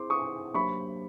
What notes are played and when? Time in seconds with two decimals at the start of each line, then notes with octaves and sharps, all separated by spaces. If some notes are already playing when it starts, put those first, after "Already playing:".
Already playing: C4 E4 G#4 C5 C6 D6
0.10 C#6 D#6
0.54 F#3 A#3 D4 G4 C5 B5 C#6